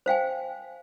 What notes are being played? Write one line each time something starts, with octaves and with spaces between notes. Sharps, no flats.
C5 F5 G5 G#5